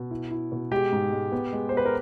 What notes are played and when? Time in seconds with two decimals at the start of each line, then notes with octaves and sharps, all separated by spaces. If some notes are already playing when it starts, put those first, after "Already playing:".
Already playing: B2
0.11 E4
0.31 E4
0.52 B2
0.72 G#3 G4
0.92 G#2
1.12 G#3
1.32 B3
1.53 G#3
1.69 C5
1.73 B3 B4
1.85 A#4